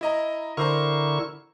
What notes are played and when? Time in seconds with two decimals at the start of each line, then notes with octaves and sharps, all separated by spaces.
0.01 E4 D#5 A#5
0.57 D3 E4 A#4 C5 A#5 C#6